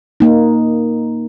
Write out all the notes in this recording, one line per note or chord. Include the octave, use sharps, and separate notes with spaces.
A#3 D#4